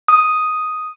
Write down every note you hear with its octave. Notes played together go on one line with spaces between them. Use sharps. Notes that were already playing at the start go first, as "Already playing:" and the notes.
D#6